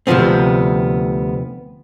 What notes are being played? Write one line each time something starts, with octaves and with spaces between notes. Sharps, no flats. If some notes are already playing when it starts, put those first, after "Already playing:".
D2 C3 E3 F3 B3 C4